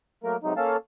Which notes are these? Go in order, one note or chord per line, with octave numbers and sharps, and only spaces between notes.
F#3 A3 A#3 A#4
C3 F#3 G#3 D#4
A#3 C#4 A4 F5 A5